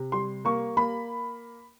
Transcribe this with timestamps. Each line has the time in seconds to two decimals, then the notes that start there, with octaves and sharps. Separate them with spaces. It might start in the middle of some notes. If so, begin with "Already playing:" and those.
Already playing: C3
0.12 G3 C6
0.45 A#3 C#6
0.77 A#3 B5